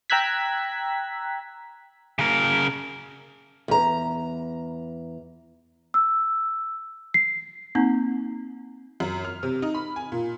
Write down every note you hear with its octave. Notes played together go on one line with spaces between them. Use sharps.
G5 A#5 E6 F#6 G#6 B6
C#3 A#4
E2 A#5
E6
C7
A#3 C4 D#4
F#2
F6
C3
D#4
B5
G#5
A#2